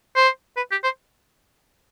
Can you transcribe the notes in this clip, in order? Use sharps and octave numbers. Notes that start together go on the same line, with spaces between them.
C5
B4
G4
C5